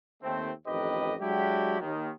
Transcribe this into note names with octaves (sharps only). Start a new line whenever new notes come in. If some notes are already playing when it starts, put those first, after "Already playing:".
D#2 A3 C4
A1 F2 D#3 G4 B4 D#5
F#3 G#3 D4 E4 F#4 G4
D#2 D#3